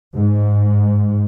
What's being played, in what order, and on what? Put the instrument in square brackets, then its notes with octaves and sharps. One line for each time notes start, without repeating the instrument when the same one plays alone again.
[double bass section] G#2